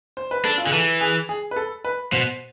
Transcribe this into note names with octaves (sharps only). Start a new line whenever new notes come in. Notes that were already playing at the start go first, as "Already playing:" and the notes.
C5
B4
D4 A4
F4
D3 G#4
E3 A4
G#4
G#4
B4
A4
B4
B2 C5